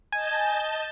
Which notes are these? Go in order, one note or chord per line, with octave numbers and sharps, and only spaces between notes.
D#5 G#5 A5 G6